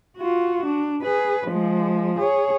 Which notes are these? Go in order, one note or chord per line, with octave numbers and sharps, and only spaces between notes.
F4 F#4
D4
G#4 B4
F3 G#3
G#4 C#5